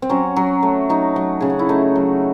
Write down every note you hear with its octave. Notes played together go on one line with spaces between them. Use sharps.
C4
F#3 C#4
F#3
A3
F#3 D#4
F#3
C#3 G#4
F#4
E4
A3 D#4
F#3